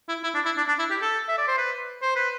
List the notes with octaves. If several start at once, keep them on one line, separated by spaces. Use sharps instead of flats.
E4
E4
D4
E4
D4
D4
E4
G4
A4
E5
D5
C5
B4
C5
B4